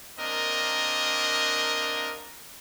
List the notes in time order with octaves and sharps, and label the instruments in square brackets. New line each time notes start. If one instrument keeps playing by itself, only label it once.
[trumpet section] A#3 C4 D4 A#4 D#5